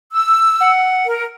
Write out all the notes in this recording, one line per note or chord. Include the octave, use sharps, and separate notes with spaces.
E6
F#5
A#4